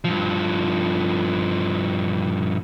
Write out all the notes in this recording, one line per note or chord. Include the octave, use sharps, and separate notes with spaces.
G2 F3